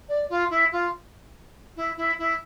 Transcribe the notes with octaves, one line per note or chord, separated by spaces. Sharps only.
D5
F4
E4
F4
E4
E4
E4